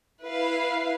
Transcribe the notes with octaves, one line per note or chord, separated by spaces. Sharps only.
E4 B4 F5